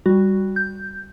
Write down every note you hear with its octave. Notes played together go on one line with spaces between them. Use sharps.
G3 F#4
G6